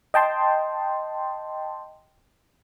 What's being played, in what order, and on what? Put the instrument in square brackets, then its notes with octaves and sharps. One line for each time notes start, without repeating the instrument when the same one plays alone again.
[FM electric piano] D#5 G5 A5 C6